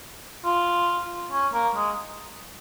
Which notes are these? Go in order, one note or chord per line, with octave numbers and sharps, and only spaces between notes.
F4
C#4
A#3
G#3